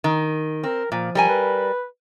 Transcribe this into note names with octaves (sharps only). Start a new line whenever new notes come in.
D#3
C4 A#4
A#2 F3
G3 A#4 G#5
B4